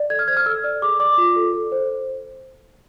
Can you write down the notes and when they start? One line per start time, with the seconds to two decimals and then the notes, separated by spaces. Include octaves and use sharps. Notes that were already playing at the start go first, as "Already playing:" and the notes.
Already playing: D5
0.10 A4 G#6
0.19 F6
0.28 C5 G#6
0.37 F6
0.46 A4 E6
0.64 D5
0.82 G#4 D6
1.00 D5 D6
1.18 F4
1.36 A4
1.54 A4
1.72 C5